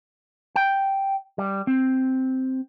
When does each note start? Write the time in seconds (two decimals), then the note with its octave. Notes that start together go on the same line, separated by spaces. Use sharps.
0.56 G5
1.38 G3
1.67 C4